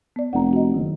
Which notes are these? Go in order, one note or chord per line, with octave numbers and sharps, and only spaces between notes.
B3 D5
F1 F#5 A#5
F#4 D#5
F#1 D#3